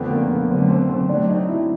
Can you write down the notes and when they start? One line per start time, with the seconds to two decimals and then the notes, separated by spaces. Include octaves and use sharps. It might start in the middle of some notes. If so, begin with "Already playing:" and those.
Already playing: F2 D3 F3 A3 B3 C4
0.11 A#3
0.31 B3
0.50 D3 F#3 A3 C4
0.69 C4
0.89 C4
1.09 D3 F#3 A3 C4 D4
1.29 D#4
1.48 E4